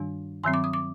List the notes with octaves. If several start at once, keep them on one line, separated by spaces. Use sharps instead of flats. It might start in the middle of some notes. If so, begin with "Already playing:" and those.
Already playing: G2 D#3 G3 D4
G2 D#3 F#3 C4 C6
D6
D#6
D6